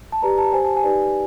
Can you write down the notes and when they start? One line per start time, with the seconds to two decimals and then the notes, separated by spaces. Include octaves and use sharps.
0.12 A5
0.22 G4 B4 D5 A#5
0.38 A5
0.52 G4 C5 G#5
0.64 A5
0.77 G#5
0.84 D#4 G4 B4 D5